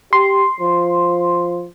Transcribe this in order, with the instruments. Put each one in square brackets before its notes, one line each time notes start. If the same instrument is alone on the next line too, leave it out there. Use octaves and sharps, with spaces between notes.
[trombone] G4 [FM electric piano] C6
[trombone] F3